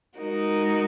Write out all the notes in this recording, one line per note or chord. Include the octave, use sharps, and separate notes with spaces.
G#3 D#4 F#4 A#4